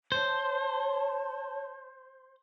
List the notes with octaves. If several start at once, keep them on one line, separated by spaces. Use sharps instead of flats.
C5 C#5 A5